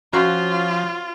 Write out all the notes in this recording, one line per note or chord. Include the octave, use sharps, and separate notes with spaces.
F3 C#4 F4 F#4 C5